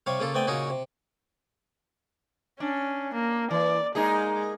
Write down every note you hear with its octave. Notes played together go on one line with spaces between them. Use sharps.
C3 G3 C#5 F5
C#3 A#3 F4 A4
A3 B3 C4 D5 G5 G#5
A#2 C#3 C#4 D#4 F#4 G#4
C3
C#4 D4
A#3
E3 D5
G#3 A#3 D#4 G#4